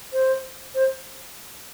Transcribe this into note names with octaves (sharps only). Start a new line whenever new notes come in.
C5
C5